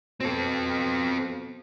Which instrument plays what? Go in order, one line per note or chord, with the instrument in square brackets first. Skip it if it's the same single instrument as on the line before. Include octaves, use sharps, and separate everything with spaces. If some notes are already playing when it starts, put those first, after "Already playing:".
[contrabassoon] B2 [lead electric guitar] C4 A4